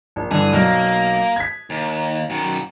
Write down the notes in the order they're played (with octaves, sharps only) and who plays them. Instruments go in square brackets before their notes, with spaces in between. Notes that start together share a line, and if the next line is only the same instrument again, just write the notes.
[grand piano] A#1
[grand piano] G2 D3 E3 [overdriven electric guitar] G#4
[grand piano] B1 [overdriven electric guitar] A#3
[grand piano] G#6 B6
[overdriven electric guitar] D#2
F#2 D#3